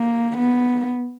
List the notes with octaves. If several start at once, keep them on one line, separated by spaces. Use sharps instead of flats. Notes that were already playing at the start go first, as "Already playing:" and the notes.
Already playing: A#3
B3